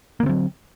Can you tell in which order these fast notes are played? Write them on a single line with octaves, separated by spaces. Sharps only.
A#3 D3 C4 F#3